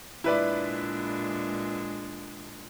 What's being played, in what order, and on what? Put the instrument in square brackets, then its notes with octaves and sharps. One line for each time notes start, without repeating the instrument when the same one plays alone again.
[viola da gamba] A#2 G#3 D4 [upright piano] E4 B4 D5